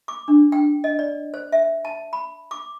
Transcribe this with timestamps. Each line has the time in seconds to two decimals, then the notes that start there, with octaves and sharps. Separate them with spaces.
0.08 D6
0.28 D4
0.52 G5
0.84 D#5
0.99 D5
1.34 C5
1.52 E5
1.85 A5
2.13 B5
2.51 D6